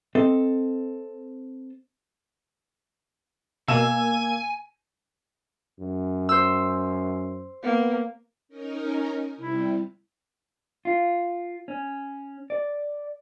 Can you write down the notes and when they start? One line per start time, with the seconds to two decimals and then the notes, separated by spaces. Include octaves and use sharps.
0.15 C4 A4 D#5
3.68 B2 A#3 G#5 E6 E7
5.79 F#2
6.29 C5 E6
7.64 A#3 B3
8.49 C#4 D#4 A#4
9.37 C3 G3 E4
10.85 F4
11.68 C#4
12.50 D5